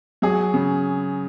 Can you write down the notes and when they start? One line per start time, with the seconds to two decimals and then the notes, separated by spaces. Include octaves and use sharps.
0.22 F#3 G#4
0.54 C#3